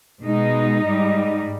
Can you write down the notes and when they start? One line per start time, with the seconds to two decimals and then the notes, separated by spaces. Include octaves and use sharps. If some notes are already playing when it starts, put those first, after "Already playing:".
0.23 B2 G#3 D#4
0.86 G#2 G3